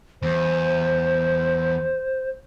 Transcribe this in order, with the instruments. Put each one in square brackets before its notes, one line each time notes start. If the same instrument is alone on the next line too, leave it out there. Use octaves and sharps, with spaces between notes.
[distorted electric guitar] E2 [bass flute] C5